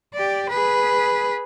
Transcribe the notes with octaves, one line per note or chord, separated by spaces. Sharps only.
G4 D5
G#4 B4